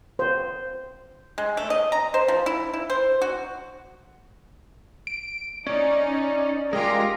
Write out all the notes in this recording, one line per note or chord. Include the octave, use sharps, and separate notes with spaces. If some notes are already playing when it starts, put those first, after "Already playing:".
C5
G#3
A3
D#5
A#5
C5
F3
E4
E4
C5
F#4
D7
C#4 D#4 D5
G#3 F4 G4 A#4 A#6